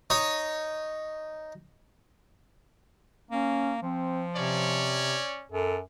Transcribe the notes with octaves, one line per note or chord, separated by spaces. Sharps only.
D#4 C#5
A#3 C#4
F3 C4
C3 C#4 C#5 D5
F#2 A4